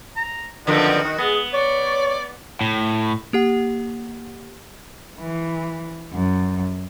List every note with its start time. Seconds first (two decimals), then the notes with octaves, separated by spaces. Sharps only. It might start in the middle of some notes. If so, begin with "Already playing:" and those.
0.16 A#5
0.67 F#2 D3 D#3 F3 C4 F#4 B4
1.04 D#3
1.18 G#3 B3 G#4
1.53 C#5 D5
2.61 A2
3.33 A#3 G4 F#5
5.19 E3
6.12 F#2